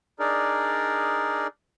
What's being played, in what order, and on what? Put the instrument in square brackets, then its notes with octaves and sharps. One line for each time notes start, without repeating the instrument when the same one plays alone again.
[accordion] D4 D#4 G#4 A#4 D5